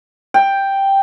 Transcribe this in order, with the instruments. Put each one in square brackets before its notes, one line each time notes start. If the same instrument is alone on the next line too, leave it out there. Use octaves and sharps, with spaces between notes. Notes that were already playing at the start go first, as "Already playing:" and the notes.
[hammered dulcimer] G5